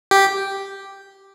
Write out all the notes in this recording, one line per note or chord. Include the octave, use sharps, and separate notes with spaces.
G4